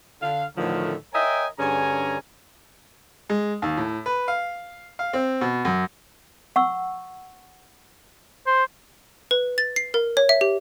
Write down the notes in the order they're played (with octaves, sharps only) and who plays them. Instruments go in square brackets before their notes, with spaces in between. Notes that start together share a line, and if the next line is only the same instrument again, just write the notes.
[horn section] D3 F5
A2 D3 D#3 F3 F#3 A3
A#4 C#5 D#5 E5 G5 G#5
G2 D3 C#4 G#4 G#5 A#5
[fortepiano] G#3
D#2
A2
B4
F5
F5
C4
B2
F#2
[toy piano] F#5 C#6 E6
[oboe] C5
[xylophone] B4
A6
C7
A#4
C#5
E5
G4